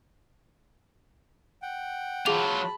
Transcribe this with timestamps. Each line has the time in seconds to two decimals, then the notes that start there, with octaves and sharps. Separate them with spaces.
1.62 F#5 G5
2.26 F#3 F4 G#4 A5 B5 D6 F7